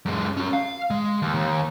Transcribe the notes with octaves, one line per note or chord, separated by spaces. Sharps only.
F#2 G#3
C#4 F#4
F5
G#3
D#2
D#2